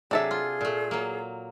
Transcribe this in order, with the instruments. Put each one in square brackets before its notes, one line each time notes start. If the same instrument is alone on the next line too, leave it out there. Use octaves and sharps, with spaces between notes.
[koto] C3 F#3 [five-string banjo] D4 A4 E5 [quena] G#4
[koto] F4
A#2 A3
F#3 A#3